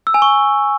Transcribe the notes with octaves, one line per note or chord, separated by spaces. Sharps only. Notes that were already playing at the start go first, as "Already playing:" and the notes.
E6
G#5
C#6